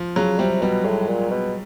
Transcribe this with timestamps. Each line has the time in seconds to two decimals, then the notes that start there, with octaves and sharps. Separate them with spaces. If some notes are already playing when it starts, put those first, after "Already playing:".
Already playing: F3
0.16 C#3 F#3
0.38 C3 G3
0.62 B2 G3
0.84 A2 G#3
1.07 A#2
1.30 B2